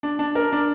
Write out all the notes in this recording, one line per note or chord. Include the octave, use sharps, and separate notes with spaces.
D4
D4
A#4
D4